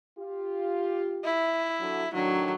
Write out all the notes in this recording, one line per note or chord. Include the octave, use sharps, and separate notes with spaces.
F4 G4
E4
D3 F#3
A2 D#3 F#3 D4